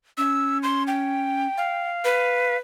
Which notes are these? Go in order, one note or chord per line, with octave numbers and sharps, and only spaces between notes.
C#4 E6
C6
G5
F5
B4